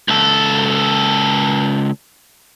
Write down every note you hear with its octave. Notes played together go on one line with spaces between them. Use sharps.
C#2 A4